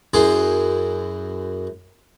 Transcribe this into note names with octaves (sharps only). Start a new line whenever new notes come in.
F#2 E4 G#4 C6